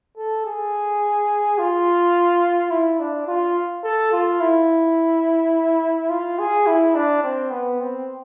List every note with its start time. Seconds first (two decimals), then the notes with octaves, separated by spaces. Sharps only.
0.17 A4
0.45 G#4
1.58 F4
2.70 E4
3.00 D4
3.27 F4
3.84 A4
4.12 F4
4.40 E4
6.09 F4
6.39 G#4
6.67 E4
6.95 D4
7.23 C4
7.51 B3
7.80 C4